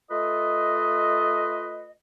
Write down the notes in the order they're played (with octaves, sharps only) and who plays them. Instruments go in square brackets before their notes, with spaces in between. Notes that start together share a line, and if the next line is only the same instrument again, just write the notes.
[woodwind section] A3 F4 A4 B4 D#5